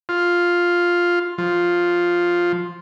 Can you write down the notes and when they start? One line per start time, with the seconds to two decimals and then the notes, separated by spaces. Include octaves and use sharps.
0.09 F4
1.38 F3